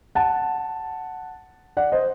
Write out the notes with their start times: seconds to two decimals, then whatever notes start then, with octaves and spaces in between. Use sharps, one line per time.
0.15 F#5 A5
1.77 D5 F#5
1.92 C5 D#5